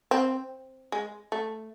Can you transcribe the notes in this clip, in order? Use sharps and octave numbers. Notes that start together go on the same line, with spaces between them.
C4
G#3
A3